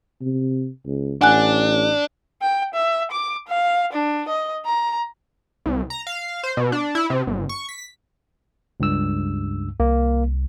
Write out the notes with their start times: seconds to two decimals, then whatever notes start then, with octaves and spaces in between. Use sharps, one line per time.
0.21 C3
0.86 C#2
1.21 A1 D4 F#5 G#5 F#6
2.42 G5
2.74 E5
3.11 D6
3.48 F5
3.93 D4
4.28 D#5
4.65 A#5
5.66 C2
5.90 A#5
6.07 F5
6.44 C5
6.57 B2
6.72 D4
6.95 E4
7.10 C3
7.27 G1
7.49 C#6
7.69 B6
8.80 C#2 G2 E6
9.80 C2 A#3